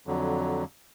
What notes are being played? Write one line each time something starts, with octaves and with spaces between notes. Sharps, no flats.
F2 D3 F#3